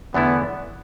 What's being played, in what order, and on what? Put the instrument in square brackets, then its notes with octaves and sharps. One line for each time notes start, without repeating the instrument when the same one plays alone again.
[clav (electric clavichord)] E2 D3 A3 E4 [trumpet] B3